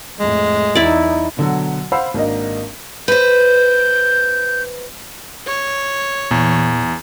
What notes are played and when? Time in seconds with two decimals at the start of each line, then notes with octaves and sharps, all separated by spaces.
0.20 F2 A2 G#3
0.75 E2 D#4 E4 D5
1.37 B2 D3 F#3
1.92 C5 F5 F#5 B5 E6
2.14 G#1 A#3 D4 D#5
3.08 B4 C5 G6
5.46 C#5
6.31 E2 A#2 E3